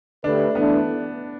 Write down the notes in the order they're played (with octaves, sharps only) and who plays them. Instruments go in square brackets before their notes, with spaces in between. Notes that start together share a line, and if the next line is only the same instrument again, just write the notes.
[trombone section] D3 A3 G4 B4 [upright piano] D4
[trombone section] E3 A3 D4 [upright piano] B3